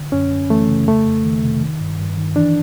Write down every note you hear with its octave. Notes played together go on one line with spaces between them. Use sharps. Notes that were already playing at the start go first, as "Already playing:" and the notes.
Already playing: D3
F#2 C#4
F#2
E3 A3
C#3
F2 A3
F2
D#3
C3
D#3
G2
G2
D#3
E3 D4